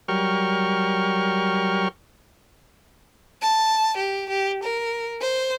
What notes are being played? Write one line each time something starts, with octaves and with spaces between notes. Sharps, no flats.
F#3 G3 A#4 G5 C#6 F6
A5
G4
G4
A#4
C5